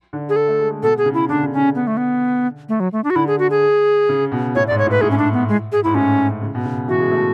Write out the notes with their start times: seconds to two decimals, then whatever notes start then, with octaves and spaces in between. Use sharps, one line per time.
0.13 D3
0.29 G#4
0.36 A4
0.48 A3
0.59 G#3
0.71 G#3
0.83 B2 A4
0.98 G#4
1.06 C#3
1.14 E4
1.29 D3 D4
1.43 C#3
1.53 D3 C#4
1.75 B3
1.87 A3
1.97 B3
2.69 A3
2.80 F#3
2.93 A3
3.04 D4
3.10 F#4
3.16 D3 E4
3.27 G#4
3.39 F#4
3.51 G#4
4.09 C#3
4.32 B2
4.55 A2 C#5
4.67 D5
4.71 G#2
4.78 C#5
4.86 A2
4.91 B4
5.01 A2 G#4
5.11 C#4
5.18 D4
5.33 B3
5.48 G#3
5.72 G#4
5.84 G#2 E4
5.95 A2 C#4
6.42 C#3
6.55 B2
6.65 C#3
6.88 E3 F#4
7.00 G#3
7.12 A3